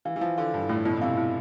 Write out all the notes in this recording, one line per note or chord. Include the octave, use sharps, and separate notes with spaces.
E3 F5
E3
F3 F5
D3 F5
G2 E4
A2 A3
B2 E4
B2
C3 F5
E4